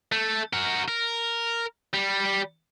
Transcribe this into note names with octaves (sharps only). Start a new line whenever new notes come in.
A3
F#4 A#4
A#4
G3